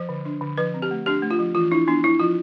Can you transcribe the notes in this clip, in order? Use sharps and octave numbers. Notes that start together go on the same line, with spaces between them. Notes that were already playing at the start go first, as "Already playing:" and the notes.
Already playing: F3 C5
D3
D4
D3
F3 B4
C4
G4
A3
D4 G4
A3
F4
F3
E3 F4
D4 E4
B3 D4
D4 E4
F3 F4